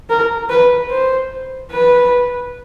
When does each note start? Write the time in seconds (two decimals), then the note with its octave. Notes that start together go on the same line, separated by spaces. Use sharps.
0.10 A#4
0.50 B4
0.90 C5
1.71 B4